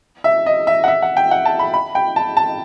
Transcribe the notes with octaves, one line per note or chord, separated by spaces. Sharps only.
E5
D#5
E5
F#5
E5
F#5
G5
F#5
A5
B5
B5
G5
A5
A5